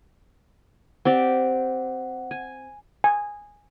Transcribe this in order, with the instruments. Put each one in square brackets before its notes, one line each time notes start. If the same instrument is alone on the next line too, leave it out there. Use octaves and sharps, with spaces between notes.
[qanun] C4 G4 D5 [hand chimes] F#5
[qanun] G#5
[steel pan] G#5